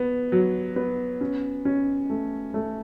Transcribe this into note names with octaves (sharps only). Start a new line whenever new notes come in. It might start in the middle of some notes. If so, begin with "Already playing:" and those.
Already playing: B3
F#3
B3
C#4
C#4
A3
A3